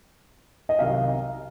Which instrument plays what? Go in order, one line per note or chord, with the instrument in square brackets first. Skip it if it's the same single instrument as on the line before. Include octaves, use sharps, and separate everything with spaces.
[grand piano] D#5
[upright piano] C2 C3 D#3 F#3 [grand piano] F5